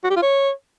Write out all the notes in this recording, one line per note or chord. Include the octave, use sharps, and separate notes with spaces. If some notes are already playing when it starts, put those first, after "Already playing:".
F#4
G4
F4
C#5